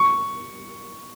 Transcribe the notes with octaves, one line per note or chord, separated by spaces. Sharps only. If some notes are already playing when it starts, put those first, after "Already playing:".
Already playing: C#6